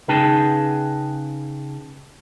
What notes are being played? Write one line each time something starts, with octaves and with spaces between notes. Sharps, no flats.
C#3 D#4 G#4 B4 G5 A5